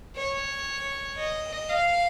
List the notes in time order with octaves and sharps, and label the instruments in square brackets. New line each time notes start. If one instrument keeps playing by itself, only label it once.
[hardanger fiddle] C#5
D#5
F5